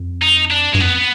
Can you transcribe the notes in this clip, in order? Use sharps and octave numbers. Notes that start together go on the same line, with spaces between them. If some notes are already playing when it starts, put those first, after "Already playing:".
Already playing: F2
D#4
D4
G2 G#3
F2 B3